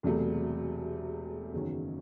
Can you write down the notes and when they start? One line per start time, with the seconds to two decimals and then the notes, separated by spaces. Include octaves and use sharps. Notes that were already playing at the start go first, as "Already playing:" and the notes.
0.03 E1 E2 C3 F#3 A3
1.53 F#1 E2 D#3 F#3 C#4